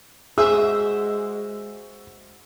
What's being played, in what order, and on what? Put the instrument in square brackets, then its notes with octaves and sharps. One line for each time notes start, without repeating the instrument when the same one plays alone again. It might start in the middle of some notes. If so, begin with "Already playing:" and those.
[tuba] G#3 [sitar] F#4 C5 E5 [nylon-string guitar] G#4 [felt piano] E6